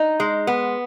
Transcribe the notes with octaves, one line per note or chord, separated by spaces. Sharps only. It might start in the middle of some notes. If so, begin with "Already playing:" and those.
Already playing: D#4
G#3
B3